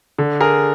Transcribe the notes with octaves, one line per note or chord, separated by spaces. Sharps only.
D3
G#4 A#4